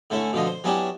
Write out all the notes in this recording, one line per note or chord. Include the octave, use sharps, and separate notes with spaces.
D3 A3 C#4 E4
B2 D3 F3 D#5
C5
F#3 B3 C#4 D4 E4 G4